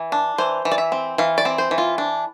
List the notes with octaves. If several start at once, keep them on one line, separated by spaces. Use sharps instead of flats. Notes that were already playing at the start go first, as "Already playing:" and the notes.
Already playing: E3
D4
E3 C5
E3
D5
E5
C4
E3 F5
D5
C4
C5
E3
F4
D4